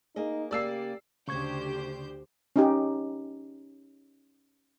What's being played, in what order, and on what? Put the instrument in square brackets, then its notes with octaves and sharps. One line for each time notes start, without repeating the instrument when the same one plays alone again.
[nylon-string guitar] A#3 G#4 D#5 [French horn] D#4
[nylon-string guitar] C#3 A#3 [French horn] G4 [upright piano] D5 E6 C7
[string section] D2 C5 G6 [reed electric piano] C#3 C#6 G#6 [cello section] D4 G4
[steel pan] C#4 D#4 G4